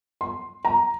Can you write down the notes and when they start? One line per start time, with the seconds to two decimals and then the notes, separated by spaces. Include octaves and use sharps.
0.21 C6
0.65 A#5